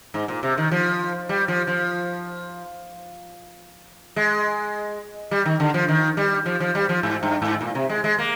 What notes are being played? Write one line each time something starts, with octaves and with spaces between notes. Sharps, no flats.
G#2
A#2
C3
D#3
F3
G3
F3
F3
G#3
G3
D#3
D3
F3
D#3
G3
F3
F3
G3
F3
G#2
G2
G#2
A#2
C3
G#3
G#3
A#3